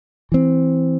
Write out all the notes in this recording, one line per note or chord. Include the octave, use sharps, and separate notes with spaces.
E3 C4